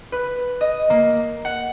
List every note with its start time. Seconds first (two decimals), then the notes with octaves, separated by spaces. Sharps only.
0.12 B4
0.61 D#5
0.90 A#3
1.45 F#5